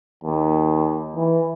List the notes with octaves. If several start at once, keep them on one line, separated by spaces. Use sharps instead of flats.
D#2
E3